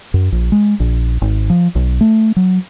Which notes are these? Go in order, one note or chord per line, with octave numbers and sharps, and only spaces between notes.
F#2
A#1
G#3
A#1
G#1
F3
B1
A3
F#3